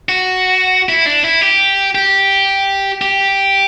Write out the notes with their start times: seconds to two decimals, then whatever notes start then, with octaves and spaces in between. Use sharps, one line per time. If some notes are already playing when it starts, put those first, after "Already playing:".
0.09 F#4
0.89 E4
1.06 D4
1.24 E4
1.41 G4
1.95 G4
3.02 G4